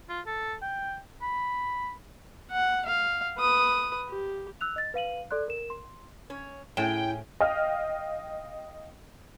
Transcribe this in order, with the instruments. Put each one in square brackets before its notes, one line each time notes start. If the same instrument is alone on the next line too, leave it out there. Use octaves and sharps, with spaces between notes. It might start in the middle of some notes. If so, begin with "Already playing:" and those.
[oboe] F4
A4
G5
B5
[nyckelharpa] F#5
F5
B4 D#6
G4
[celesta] E6 F#6 F7
D#5 A6
B4 F5 D#7 F#7
A4 D5 C6 F#6
A#4 E7
C6
[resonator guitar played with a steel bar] C#4 C#5
[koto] A2 [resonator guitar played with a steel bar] C#4 G#4 [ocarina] E4 [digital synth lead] G5
[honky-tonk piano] D#5 F5 G5 F6